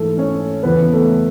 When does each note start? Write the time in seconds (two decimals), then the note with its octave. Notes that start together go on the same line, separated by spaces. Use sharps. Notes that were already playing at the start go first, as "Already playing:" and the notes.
Already playing: G#2 E3 A3 A4
0.18 C#4 C#5
0.63 E2 C#3 E3 B3 B4
0.93 A3 A4